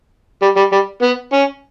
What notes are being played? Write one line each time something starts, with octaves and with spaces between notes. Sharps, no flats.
G3
G3
G3
B3
C#4